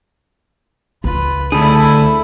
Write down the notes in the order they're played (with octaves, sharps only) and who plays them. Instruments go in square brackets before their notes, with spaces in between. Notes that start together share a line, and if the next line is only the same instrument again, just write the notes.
[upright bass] C#2 [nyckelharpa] F4 B4
[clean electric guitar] D2 G#4 [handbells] D4 B5 [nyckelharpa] E4 A4